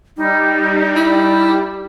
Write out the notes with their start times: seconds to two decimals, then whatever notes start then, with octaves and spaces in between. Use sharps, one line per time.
0.17 G3 D#4
0.96 E4